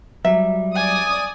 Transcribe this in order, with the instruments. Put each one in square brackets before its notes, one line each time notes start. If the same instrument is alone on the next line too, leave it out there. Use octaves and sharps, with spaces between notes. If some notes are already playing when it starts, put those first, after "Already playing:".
[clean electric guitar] F#3 G3 [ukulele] E5
[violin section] D5 D#6 [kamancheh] G#5